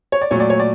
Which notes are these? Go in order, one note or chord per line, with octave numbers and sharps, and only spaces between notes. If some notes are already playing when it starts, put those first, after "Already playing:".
C#5
D5
A#2 F#3 A3 C#5
D5
C#5
D5